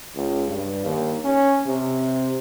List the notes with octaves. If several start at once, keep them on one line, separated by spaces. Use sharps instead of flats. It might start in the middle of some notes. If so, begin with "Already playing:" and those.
C#2
G2
D#2
C#4
C3